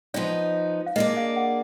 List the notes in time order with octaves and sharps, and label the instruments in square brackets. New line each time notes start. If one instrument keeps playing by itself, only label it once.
[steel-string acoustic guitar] F3 B3 D#4 [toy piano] D5
[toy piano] F5
[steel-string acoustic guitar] A#3 D4 G#4 D5 [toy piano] D#5
[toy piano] F5
F#5